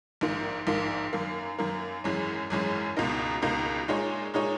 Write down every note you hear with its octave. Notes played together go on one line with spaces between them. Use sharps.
A#1 G#2 D#3 A#3
A#1 G#2 D#3 A#3
F#2 D#3 A#3
F#2 D#3 A#3
G#1 F#2 E3 G#3 C#4
G#1 F#2 E3 G#3 C#4
C#2 B2 A#3 D#4 A#4
C#2 B2 A#3 D#4 A#4
A#2 G#3 D#4 G#4 C#5
A#2 G#3 D#4 G#4 C#5